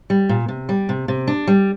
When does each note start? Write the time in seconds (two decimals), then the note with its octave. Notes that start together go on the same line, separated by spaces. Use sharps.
0.10 G3
0.29 A#2
0.48 C3
0.69 G3
0.89 C3
1.08 C3
1.27 D4
1.47 G3